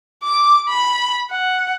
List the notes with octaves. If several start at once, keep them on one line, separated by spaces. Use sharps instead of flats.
D6
B5
F#5